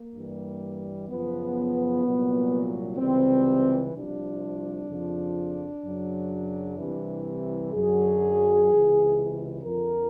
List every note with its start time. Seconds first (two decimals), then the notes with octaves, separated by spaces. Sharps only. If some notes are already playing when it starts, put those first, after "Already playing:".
Already playing: A#3
0.14 G2 E3 G3
1.09 F#2 C#3 F3 B3
2.04 C2 A#2 F#3
2.98 C#2 C3 E3 G3 C4
3.93 C2 C3 F3 D4
4.89 F2 C#3 F3
5.84 F#2 C#3 F#3
6.78 C2 C3 E3
7.73 F#2 D3 F#3 G#4
8.69 C#2 C3 E3
9.63 F2 D3 F3 A#4